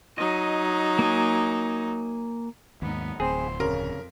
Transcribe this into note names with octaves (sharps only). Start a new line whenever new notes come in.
F#3 D#4 D#5
A#3 G#5
D#2 G#2 B3 D#4
D1 E3 C4 G#4 C5
F2 C#3 A#4